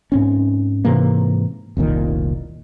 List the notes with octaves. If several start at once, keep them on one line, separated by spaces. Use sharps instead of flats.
G#2 C4 C#4
G#2 C3 E3 A#3
F1 C2 A#2 D#3